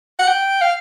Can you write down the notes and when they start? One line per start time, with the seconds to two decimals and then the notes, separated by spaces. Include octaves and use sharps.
0.19 F#5
0.27 G5
0.61 F5